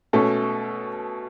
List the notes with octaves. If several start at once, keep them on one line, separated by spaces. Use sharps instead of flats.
B2 A3 C#4 A4